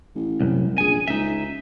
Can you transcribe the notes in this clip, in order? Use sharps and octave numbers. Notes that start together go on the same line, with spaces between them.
A1
C2 F#2
A#1 G#4 G#5
C#2 D#4 E5